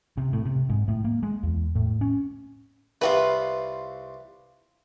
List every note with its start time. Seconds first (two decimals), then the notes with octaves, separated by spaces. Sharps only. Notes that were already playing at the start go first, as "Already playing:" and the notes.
0.17 C3
0.33 A2
0.45 C3
0.69 G#2
0.88 A2
1.04 A#3
1.23 G#3
1.43 E2
1.75 A2
2.01 C#4
3.01 C2 C3 F4 F#4 B4